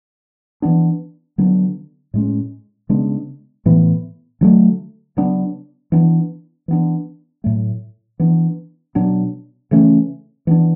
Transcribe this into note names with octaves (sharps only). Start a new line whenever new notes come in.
E3 B3 D4
D3 F#3 B3 D4
A2 G#3 C#4
C#3 G#3 B3 D4
A2 E3 B3
D3 F#3 A3
C#3 F#3 B3 D4
E3 B3 D4
E3 B3 D4
A2 F#3 A3
E3 B3 D4
B2 F#3 B3 D4
C#3 E3 A3 C#4
E3 B3 D4